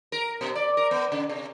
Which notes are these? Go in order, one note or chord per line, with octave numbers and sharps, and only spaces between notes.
A#4
B2
D5
A#4
B3
C#3
C3